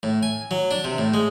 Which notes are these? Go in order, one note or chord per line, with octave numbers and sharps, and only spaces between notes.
A2
G#5
F#3
D4
C3
A2
G#3